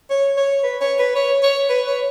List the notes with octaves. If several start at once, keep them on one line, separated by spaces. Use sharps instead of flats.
C#5
C#5
B4
C#5
B4
C#5
C#5
B4
C#5